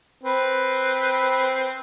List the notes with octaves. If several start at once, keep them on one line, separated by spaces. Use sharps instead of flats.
C4 B4